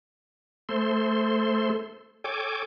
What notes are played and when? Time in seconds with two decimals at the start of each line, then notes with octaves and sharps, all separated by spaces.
0.69 A3 A4 C5 C6
2.24 A4 C#5 G5 G#5 D6